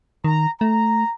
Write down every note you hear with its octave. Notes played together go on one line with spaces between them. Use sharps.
D#3 A#5
A3 A#5